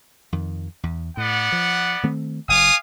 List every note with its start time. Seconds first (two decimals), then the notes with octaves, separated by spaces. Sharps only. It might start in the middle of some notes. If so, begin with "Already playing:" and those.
0.32 F2 D#3
0.83 E2
1.17 A2 B3 D5 F#5
1.52 F3
2.03 D#3 A3 C4
2.48 F#1 F#2 F5 G#5 D#6